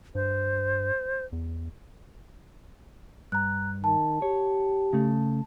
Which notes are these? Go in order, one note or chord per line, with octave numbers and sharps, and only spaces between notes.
G2 C5
E2
G2 A#5 F#6
D#3 A5
G4 C#5
C#3 A3